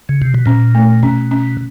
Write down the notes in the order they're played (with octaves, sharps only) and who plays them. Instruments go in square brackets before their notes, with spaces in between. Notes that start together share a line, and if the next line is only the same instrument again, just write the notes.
[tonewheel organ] C#3
C3
B2
[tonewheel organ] A#2 [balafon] C#4
[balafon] A3
[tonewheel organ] B2 [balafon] C#4
[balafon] C#4